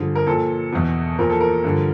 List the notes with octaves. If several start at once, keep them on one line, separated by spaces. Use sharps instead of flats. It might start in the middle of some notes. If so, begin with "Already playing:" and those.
Already playing: G2 D3 F3 G#4
A#4
A#2 F3 A4
E2 B2
A#2 F3 A#4
A4
A#4
G2 D3 F3